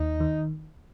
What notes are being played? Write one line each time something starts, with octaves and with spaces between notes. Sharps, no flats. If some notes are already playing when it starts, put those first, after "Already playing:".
Already playing: D#2 D#4
D#3